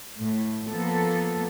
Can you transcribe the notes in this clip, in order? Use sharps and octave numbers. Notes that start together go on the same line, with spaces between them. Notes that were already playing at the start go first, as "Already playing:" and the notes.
A2
F3 A#3 B3 A4